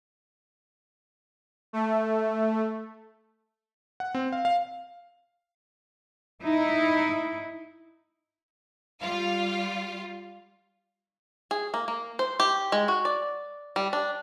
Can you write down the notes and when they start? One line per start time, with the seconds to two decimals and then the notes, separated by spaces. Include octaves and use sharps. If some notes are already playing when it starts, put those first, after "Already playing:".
1.73 A3
4.00 F#5
4.15 C4
4.32 F5
4.45 F5
6.42 D#4 E4
9.01 G3 F4 F5
11.51 G#4
11.74 A#3
11.88 A#3
12.19 C5
12.40 G4
12.72 G#3
12.88 F#4
13.05 D5
13.76 G3
13.93 D4